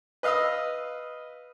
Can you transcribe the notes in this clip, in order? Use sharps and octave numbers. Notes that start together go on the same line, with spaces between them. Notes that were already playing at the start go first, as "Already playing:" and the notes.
B4 D#5 F5 D#6 E6